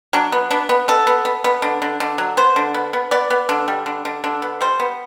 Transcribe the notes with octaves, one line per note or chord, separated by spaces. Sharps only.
F#3 D4
B3
B3 D4
B3
B3 A4
B3
B3
B3
D3
D3
D3
F#3
B3 C5
D3
B3
B3
B3 D5
B3
D3
G3
D3
D3
D3
B3
G3 C5
B3